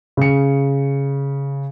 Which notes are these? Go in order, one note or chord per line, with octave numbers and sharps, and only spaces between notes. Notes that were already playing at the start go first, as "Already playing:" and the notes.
C#3 C#7